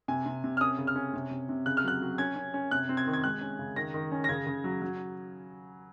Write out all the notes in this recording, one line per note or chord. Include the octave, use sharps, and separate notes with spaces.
C3 G#5
C3
C3
F6
C#4 D#6
C#3
F6
C#4
C3
C3
C3
C#3 F#6
F6
F#3 F#6
F#3
C#4 G#6
C#4
C#4
C3 F#6
C4
G#6
D#3
G#6
G#3 F#6
C#4
C#3
D#3 A#6
D#3
C#4
A#6
C#3 G#6
C#3
F#3
F#3